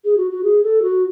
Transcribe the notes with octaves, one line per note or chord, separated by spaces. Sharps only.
G#4
F#4
F#4
G#4
A4
F#4